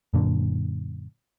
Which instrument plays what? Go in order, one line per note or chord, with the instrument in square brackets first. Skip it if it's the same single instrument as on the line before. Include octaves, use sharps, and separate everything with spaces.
[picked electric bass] F#2 A#2 D3